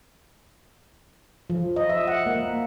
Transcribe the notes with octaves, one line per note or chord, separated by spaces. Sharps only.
F3
D#5
E5
F#5
A#3